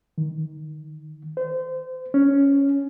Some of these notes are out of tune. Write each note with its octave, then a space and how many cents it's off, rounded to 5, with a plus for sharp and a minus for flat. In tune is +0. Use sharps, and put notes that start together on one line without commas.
D#3 +25
C5 -30
C#4 +5